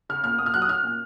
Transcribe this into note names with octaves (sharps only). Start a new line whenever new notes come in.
C#3 F6
A#2 F6
A#2 D#6
F6
F#3 F#6
D#6
C#4 F6
A#2